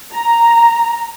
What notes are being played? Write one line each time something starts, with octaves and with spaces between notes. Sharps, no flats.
A#5